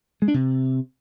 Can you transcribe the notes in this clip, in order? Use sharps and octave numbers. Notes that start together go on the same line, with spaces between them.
G#3
D4
C3